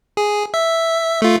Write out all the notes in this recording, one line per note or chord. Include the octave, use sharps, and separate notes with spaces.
G#4
E5
A3 F4